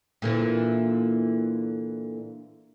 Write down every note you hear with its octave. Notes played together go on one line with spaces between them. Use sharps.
A#2 D3 E3